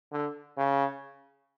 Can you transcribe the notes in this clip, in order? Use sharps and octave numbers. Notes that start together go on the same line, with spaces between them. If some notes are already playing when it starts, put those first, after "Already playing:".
D3
C#3